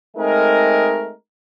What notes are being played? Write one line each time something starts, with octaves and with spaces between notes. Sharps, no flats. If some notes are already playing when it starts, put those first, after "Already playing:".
G#3 A3 C4 D#4 A#4